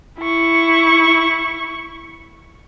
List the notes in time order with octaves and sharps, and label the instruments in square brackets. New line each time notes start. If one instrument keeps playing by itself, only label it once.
[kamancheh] E4 C#6